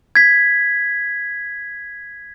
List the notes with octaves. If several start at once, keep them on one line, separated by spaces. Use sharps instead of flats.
G#6 B6